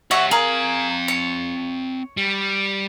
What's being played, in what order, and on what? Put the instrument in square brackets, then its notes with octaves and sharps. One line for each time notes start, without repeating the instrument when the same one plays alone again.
[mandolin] F#4 E5 C#6 [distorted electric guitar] G4 C#5
[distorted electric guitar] C4 F5 [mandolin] G#4 A#4
[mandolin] C#5
[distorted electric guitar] G3